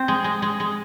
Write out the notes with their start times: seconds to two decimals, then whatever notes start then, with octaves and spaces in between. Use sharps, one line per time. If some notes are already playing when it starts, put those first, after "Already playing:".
Already playing: C4
0.08 G#3
0.24 G#3
0.42 G#3
0.60 G#3